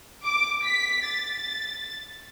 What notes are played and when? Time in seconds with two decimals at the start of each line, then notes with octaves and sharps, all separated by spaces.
0.24 D6
0.65 B6
1.06 A6